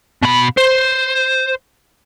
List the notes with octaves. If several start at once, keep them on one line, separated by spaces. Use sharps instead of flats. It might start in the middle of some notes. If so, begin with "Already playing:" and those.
B2 B5
C5